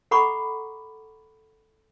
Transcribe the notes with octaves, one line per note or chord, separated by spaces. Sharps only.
A4 F#5 A#5 B5 C#6 D6